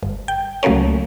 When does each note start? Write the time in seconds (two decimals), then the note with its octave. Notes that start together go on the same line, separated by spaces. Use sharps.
0.03 G1
0.28 G5
0.63 C#2 F#3 A3 A#3 C#4